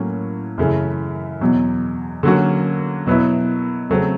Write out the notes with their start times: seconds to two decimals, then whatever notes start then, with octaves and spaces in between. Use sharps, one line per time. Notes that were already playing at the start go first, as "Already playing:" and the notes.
Already playing: A2 F#3 A#3 C#4
0.58 F#2 C#3 E3 A3
1.41 E2 B2 F#3
2.23 D3 F#3 A#3 C#4 F#4
3.06 B2 F#3 B3 E4
3.90 C#3 F#3 A3 C4